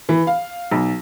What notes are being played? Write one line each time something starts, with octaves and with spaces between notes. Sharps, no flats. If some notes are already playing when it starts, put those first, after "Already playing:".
E3
F5
B1